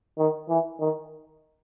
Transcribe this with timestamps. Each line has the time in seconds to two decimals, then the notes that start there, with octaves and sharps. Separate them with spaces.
0.18 D#3
0.49 E3
0.80 D#3